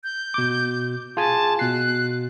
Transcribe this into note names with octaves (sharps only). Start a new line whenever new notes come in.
G6
B2 D6
F4 G#4 G#5 A5
B2 F#6 C7